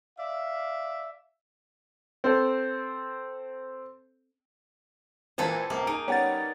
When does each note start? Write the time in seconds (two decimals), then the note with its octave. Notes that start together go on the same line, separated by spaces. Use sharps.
0.17 D5 E5 F5
2.24 C4 A4
5.38 A#2 E3 C4 G#4 A4 B4
5.70 C#2 C3 A#3
5.87 D#4 G#4 D7
6.08 G3 B3 C#4 C#5 F#5 A6